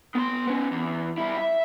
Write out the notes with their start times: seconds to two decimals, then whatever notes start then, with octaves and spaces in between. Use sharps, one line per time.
0.15 B3 C6
0.47 B3 C#4
0.71 E2
1.18 G3 E4
1.37 E5